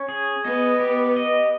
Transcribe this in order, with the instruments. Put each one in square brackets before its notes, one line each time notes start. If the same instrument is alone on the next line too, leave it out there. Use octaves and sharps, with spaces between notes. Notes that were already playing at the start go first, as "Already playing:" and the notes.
Already playing: [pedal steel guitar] C#4
G#4
[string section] B3 [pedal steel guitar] D#5
[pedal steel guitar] G4
D#5